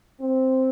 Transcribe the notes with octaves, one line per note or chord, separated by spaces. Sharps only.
C4